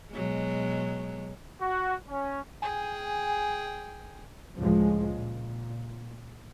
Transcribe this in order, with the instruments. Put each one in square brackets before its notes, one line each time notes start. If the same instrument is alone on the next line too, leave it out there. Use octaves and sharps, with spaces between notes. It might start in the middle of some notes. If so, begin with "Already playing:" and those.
[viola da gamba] B2 F#3 G#3
[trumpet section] F#4
C#4
[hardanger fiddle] G#4 G5 [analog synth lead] G#5
[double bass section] C#2 A2 F3 G#3
A#2